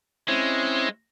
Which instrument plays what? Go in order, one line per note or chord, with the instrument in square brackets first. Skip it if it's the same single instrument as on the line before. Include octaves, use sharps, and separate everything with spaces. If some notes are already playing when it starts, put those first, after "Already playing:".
[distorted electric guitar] G#3 [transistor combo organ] C4 C#4 E4